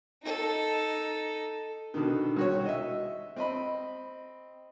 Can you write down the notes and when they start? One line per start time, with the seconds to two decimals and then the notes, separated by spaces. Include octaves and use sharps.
0.23 D#4 A4
1.94 B2 D3 D#3
2.36 C2 F#4 C#5
2.65 D#5 E5
3.36 C4 D#5 B5